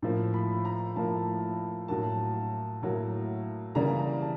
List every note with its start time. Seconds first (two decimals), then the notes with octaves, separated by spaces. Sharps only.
0.02 A2 F3 A#3
0.34 B5
0.65 A#5
0.96 A2 F3 A#3 A5
1.88 A2 F#3 A#3 A5
2.83 A2 F#3 A#3
3.75 C#3 E3 G3 A#3 A#5
3.99 A#5
4.21 A5